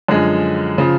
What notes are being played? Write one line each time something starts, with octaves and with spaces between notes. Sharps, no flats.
F#2 D3 F3 G#3
C#3 F3